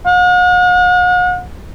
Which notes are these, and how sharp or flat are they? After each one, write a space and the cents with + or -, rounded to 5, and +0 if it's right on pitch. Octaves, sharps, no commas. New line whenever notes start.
F#5 -45